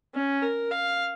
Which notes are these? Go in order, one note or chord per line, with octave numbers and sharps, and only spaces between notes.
C#4
A#4
F5